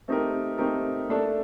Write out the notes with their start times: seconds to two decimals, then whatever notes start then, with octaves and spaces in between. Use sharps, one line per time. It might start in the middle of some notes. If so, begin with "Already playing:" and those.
0.08 A3 C4 D#4 G4 A#4
0.58 A3 C4 D#4 G4 A#4
1.09 A3 D4 A4